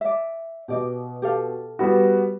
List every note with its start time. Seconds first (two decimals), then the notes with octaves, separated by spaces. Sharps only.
0.01 D5 E5
0.68 B2 G4 D5 D#5
1.22 G4 A4 F5
1.79 G3 B3 F#4